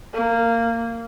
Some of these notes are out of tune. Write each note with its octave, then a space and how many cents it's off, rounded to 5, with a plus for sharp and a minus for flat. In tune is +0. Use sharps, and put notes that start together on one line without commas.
A#3 -15